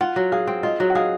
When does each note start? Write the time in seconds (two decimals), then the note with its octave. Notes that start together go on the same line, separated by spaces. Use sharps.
0.01 F4 F#5
0.16 F#3
0.32 G#4 F5
0.47 C4
0.63 F4 D#5
0.80 F#3
0.90 F#5
0.95 G#4 F5